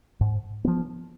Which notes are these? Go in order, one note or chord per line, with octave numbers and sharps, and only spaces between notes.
G#2
F3 B3